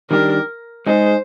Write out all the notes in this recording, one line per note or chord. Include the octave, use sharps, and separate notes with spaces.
D#3 G3 D4 G4 A#4
G#3 D#4 G#4 C5